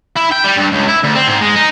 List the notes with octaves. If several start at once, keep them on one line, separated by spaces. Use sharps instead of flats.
E4
G5
G3
G2
C#2
E4
D2
C4
G#2
G#3
D#4